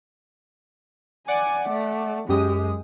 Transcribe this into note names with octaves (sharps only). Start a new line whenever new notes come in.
D5 F#5 G#5 D6
A3
F#2 G#3 G4 D#6